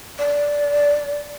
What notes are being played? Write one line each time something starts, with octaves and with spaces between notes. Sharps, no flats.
D5